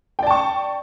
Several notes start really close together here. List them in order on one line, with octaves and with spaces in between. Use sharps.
G5 D5 A5 C#6